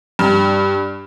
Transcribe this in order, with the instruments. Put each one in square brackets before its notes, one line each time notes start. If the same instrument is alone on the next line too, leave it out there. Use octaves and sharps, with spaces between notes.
[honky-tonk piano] G2